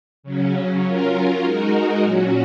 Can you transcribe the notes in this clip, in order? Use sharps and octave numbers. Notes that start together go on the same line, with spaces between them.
C#3 F#3 C#4
F#3 C#4 F4 A#4
G#3 D#4 F#4 A#4
A#2 F#3 C#4 F#4